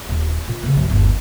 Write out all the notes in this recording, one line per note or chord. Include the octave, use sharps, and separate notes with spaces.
D#1
A#2
C#3 A#3
B1 F#2
G1 D#2